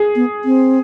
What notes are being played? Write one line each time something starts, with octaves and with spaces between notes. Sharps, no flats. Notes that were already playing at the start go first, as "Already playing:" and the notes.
Already playing: G#4
B3
C4